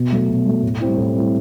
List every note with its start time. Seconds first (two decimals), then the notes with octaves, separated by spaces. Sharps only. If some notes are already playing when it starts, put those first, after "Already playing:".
Already playing: B2
0.11 F#3 A3
0.29 B2
0.46 F#3 A3
0.63 A2
0.81 G3 C4 E4
0.97 A2
1.15 G3 C4 E4